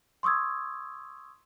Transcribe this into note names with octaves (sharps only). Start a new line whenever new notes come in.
C6 C#6 D#6 E6 G#6